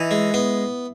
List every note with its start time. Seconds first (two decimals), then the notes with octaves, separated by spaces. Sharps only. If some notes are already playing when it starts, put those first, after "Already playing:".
Already playing: E3 D#4
0.11 G#3
0.34 B3